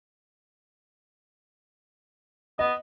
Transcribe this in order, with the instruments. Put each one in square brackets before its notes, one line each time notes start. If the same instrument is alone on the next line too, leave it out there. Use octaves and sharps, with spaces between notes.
[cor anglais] B3 [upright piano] D#5